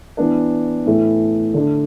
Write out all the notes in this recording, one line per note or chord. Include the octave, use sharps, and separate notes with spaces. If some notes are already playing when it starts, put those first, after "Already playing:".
E3 B3 D4
A2 E3 A3 E4
D3 A3 D4